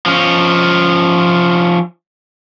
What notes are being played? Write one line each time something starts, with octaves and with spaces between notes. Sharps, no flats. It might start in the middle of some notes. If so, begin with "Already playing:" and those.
F3 C#4